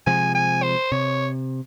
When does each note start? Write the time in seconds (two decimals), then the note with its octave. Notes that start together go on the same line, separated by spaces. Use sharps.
0.07 C3 F3 G#3 G#5
0.35 G#5
0.63 C5
0.92 C3 C#5